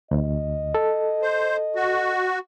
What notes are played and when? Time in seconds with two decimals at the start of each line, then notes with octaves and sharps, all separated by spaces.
0.11 D2 D#5
0.75 A4
1.22 C5
1.76 F#4